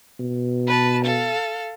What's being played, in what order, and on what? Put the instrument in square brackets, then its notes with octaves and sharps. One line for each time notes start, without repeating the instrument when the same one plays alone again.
[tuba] B2
[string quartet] B4 A5
A4 F5